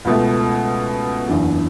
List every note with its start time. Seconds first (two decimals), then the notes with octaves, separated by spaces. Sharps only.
0.05 C#2 B2 A3
1.27 F#1 E2 D3 F#3